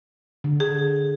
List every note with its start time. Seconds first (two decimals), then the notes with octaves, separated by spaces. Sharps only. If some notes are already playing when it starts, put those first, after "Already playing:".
0.44 D3
0.60 G#4